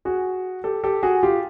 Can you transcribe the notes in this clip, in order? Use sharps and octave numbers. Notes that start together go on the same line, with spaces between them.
F#4 G#4
G4 A4
G4 A4
F#4 G#4
F4 G4